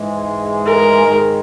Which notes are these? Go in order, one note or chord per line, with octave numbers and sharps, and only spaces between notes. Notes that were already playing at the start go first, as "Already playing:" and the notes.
Already playing: G#2 E3 G#3
A#4
G#2 D#3 G#3